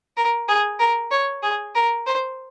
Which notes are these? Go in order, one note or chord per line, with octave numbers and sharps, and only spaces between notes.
A#4
G#4
A#4
C#5
G#4
A#4
C5